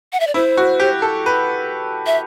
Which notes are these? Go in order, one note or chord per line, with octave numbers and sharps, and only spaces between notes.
F#5
E5
D5
E4 C5
F#4
G4
A4
B4
E5